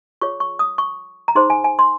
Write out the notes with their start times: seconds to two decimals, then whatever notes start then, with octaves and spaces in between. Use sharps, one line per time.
0.21 F4 G#4 C#5 C#6
0.40 C#6
0.59 D#6
0.78 C#6
1.28 A#5
1.35 D#4 G#4 C5 C6
1.50 G#5
1.64 G#5
1.79 C6